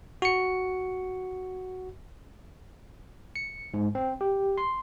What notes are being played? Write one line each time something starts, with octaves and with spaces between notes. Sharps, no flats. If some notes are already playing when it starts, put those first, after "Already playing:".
F#4 C#7
C#7
G#2
C4
G4
C6